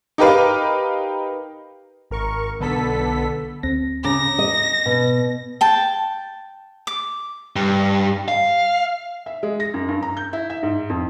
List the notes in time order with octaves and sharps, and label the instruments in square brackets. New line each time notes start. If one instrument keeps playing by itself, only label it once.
[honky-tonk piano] D#4 G4 A#4 B4 F5
[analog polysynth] G#1 A#4 C#6
B1 D3 B3 A4 B6
[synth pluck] D2 C4 A#6
[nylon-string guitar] C#3 [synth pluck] A#5 D6 [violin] A#6
[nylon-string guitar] D#5
B2
[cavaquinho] G5 A5
D6
[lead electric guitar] G2
F5
[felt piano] E5
G#3
A#6
F#2
G2
A#5
G6
E4
E5
G#2
F2